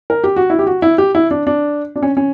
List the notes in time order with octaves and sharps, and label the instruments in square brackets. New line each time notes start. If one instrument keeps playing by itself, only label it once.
[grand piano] A#4
G4
F#4
E4
G4
F#4
E4
G4
E4
D4
D4
D4
C#4
C#4